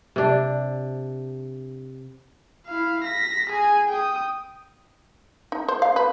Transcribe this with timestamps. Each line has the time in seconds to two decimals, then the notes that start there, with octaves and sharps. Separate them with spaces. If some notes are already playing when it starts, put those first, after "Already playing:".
0.16 C3 D4
2.67 E4 F5
3.04 A#6 B6
3.50 G#4 G#5
3.89 G5 D#6
5.52 D#4
5.68 C5
5.82 F5
5.96 B4